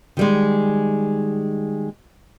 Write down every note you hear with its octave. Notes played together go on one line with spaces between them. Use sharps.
D#3 G3 G#3